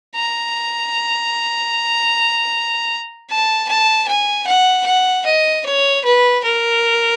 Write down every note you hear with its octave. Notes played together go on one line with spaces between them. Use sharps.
A#5
A5
A5
G#5
F#5
F#5
D#5
C#5
B4
A#4